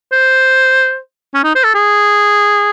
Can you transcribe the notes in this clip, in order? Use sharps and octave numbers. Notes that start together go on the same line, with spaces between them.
C5
C#4
D#4
C5
A4
G#4